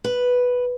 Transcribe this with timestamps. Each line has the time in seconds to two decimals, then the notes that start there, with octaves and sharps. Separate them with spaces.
0.04 B4